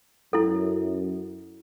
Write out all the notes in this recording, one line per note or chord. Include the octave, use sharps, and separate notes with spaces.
F#2 E4 A4